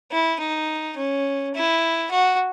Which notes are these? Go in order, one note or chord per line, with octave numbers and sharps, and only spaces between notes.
E4
D#4
C#4
E4
F#4